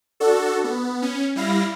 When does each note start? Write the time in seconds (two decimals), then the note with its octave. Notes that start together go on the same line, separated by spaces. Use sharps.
0.20 D4 F#4 A4
0.64 B3
1.02 C#4
1.36 G3 E4 F5 A#6